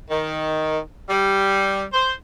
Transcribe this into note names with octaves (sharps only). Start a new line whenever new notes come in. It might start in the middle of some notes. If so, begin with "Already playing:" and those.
D#3
G3
C5